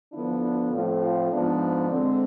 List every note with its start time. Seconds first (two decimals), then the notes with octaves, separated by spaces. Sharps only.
0.12 D3 F3 B3 D4 E4
0.41 E4
0.71 A2 F3 A3 C4 F4
1.01 F4
1.31 G#2 F3 B3 D4
1.90 D3 G#3 C4